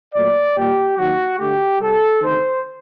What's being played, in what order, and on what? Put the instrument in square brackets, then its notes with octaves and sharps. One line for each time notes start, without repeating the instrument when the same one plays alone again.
[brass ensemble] A#2 F#3 A3 D5
A#2 G3 A#3 G4
D#2 D#3 F#3 F#4
D2 D3 A3 G4
C2 C3 G3 A4
D2 C3 D#3 C5